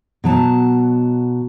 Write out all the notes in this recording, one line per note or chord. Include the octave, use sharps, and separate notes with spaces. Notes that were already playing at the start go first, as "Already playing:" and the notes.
B2 F#3 A5